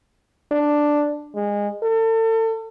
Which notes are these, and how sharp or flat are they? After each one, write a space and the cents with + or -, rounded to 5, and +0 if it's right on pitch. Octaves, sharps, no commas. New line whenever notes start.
D4 +5
G#3 -20
A4 +35